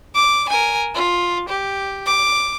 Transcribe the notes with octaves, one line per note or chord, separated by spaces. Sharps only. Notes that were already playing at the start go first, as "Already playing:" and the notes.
D6
A#4 G#5
F4
G4
D6